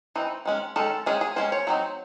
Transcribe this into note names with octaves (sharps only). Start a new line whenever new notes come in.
E3 C4 D#4
D#3 G#3 C#4
D#3 G#3 C#4 A4
D#3 G#3 C#4 G#4
G#4
D#3 G#3 C#4 C5
C#5
F#3 C4 D#4